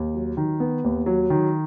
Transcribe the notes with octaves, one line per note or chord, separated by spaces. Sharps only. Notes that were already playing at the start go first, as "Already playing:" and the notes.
Already playing: D#2
F#3
D#3
B3
D#2
F#3
D#3